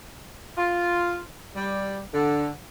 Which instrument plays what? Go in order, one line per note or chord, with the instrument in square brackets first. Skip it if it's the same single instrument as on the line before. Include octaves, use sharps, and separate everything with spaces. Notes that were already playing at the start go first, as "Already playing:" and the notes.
[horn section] F4
G3
D3